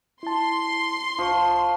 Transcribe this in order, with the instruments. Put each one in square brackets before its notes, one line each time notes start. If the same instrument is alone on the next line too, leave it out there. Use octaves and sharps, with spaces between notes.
[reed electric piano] E4 A5 [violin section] C6
[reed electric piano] C2 C#6 [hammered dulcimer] F3